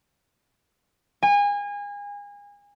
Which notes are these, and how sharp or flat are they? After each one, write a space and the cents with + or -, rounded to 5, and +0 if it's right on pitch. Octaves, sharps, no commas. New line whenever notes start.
G#5 -30